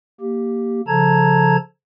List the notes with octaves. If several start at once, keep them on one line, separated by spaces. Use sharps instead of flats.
A#3 G4
C#3 F3 A4 A5 A#5 G#6